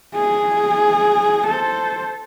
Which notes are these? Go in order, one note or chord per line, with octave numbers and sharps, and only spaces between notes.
G#4
A4 C5